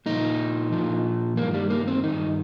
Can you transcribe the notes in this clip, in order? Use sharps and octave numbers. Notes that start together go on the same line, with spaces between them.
A#2 F3 D#4
A#2 F3
G2 D#3 A#3
G3
A#3
C4
G2 D#3 D#4